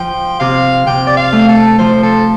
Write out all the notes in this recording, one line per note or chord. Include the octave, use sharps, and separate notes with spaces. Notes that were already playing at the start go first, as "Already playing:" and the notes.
Already playing: F3 G5
C3 F5
C3 G5
D5
F5
A3
A4
F3 C5
A4